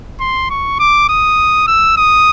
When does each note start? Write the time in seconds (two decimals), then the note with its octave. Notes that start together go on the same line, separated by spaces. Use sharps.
0.20 C6
0.50 C#6
0.79 D6
1.09 D#6
1.67 E6
1.97 D#6